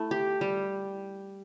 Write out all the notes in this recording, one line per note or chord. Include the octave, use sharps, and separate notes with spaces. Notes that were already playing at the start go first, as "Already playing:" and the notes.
Already playing: A3 E4
G4
G3